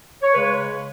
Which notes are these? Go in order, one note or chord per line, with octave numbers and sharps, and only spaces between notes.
C#5
C#3 G#3 B4